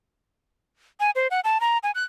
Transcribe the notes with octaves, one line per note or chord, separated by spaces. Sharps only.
G#5
C5
F#5
A5
A#5
G#5
F#6